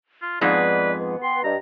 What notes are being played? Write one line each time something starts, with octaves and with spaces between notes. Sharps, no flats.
F4
F2 G#2 G#3 B3 B4 D5
B4
G5 C6
G2 D#5 A#5